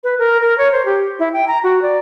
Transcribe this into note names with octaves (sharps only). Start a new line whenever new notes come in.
B4
A#4
A#4
C#5
C5
G4
E4
G5
A#5
F#4
D5